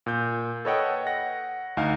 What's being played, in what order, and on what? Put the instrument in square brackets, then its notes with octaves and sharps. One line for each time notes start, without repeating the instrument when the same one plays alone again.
[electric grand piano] A#2 G6
A4 B4 C#5 D#5 F#5 G5
F#5 A#6
D2 D#4 F5